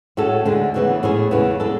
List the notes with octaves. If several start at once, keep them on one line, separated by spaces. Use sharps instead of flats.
A2 G#3 C#4 F#4 A4
D2 D3 G#3
D2 C#3 E3 B3 E4
A2 G#3 C#4 G#4
E2 C#3 E3 B3
G#3 D4 A4